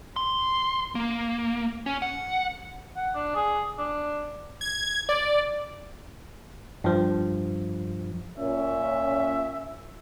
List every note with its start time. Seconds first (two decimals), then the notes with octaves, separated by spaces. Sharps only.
0.16 C6
0.95 A#3
1.86 C#4
2.02 F#5
2.96 F#5
3.15 D4
3.35 G#4
3.79 D4
4.61 G#6
5.09 D5
6.84 G2 F3
8.38 A#2 C#4 E5